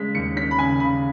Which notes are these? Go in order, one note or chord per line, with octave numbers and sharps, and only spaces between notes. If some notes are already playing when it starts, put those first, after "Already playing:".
Already playing: C#3 G#3 C#4 B6
D#2 C#7
C#4 B6
B5
C#3 G#5
C#3 B5